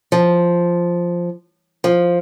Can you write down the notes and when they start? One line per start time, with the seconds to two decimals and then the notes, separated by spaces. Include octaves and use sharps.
0.12 F3
1.84 F3